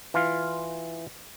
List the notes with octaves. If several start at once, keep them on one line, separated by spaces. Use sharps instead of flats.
E3 F4 F5